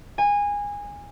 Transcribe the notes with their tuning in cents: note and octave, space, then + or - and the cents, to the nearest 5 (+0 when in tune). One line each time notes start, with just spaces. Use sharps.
G#5 -20